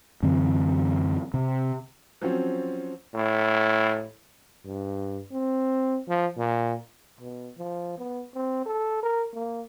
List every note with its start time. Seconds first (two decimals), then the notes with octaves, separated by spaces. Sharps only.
0.23 F#2 D3 E3 C4
1.34 C3
2.21 F3 F#3 C4 C#4
3.14 A2
4.66 G2
5.32 C4
6.08 F3
6.37 A#2
7.20 B2
7.58 F3
7.98 B3
8.34 C4
8.66 A4
9.03 A#4
9.34 A#3